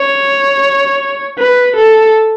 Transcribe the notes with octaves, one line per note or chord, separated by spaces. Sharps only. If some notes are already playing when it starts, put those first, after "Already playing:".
Already playing: C#5
B4
A4